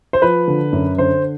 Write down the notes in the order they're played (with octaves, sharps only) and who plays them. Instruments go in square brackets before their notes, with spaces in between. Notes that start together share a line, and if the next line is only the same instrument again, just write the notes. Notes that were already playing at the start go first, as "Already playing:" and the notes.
[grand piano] C5
F3 B4
D3
F#2
D3 C5